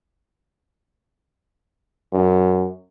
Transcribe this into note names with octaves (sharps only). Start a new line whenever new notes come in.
F#2